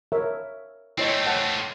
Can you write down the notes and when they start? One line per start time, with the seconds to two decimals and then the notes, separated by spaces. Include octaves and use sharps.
0.12 A#4 C#5 E5
0.98 A3 C4 E4 C#5 D#5
1.26 C#5 F#5 A5